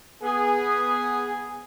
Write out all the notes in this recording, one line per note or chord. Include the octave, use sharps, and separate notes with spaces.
B3 G#4